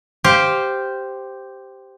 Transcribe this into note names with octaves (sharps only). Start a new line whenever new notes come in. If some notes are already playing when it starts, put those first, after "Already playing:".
G4 C5 F5